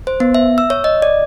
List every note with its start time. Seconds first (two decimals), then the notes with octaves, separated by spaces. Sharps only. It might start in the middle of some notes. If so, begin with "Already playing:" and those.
0.07 C5
0.20 B3
0.34 E5
0.58 E6
0.70 C#5
0.84 D#5
1.02 D5